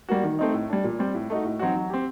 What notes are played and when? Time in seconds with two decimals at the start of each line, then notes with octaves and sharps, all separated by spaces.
0.09 G3 A#3 F#4
0.23 D#3
0.39 A3 C4 D#4
0.54 A2
0.69 G3 D4
0.84 A#2
0.99 G3 C4
1.14 A2
1.30 A3 D#4 F#4
1.44 A2
1.59 F#3 C4 D#4 F#4
1.75 F#3
1.90 C4 G4